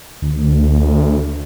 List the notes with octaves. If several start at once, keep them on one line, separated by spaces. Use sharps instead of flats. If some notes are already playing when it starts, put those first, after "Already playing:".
D2